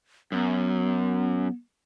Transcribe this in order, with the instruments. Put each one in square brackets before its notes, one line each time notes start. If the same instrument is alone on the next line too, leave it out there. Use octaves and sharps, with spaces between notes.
[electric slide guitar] F#2 [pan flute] B3